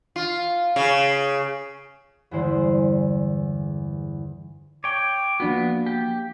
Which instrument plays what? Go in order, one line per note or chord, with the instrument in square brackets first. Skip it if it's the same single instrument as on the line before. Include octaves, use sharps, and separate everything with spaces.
[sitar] F4
C#3
[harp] E2 G2 D3 G#3 E4 C5
[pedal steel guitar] C#5 G5 [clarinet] D6
[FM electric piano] F3 D4 F#4 [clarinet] A#3 [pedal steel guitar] B3
[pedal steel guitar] G4